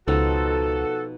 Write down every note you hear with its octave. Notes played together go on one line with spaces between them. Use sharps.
C#2 B2 F3 D#4 F#4 A4